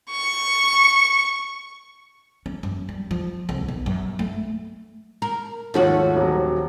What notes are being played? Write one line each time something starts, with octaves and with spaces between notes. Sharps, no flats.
C#6
C#4
F#2
G3
F3
C2
B1
F#2
A3
A#4
D#2 G#2 F3 A3 C#4 F#4
D#1 F#3